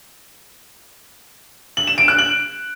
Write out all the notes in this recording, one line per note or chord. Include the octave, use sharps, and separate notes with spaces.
F#7
E7
D7
F#6
F#7